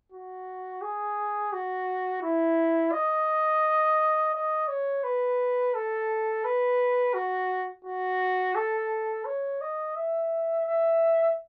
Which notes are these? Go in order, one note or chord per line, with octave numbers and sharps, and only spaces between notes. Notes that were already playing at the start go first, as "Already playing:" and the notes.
F#4
G#4
F#4
E4
D#5
D#5
C#5
B4
A4
B4
F#4
F#4
A4
C#5
D#5
E5
E5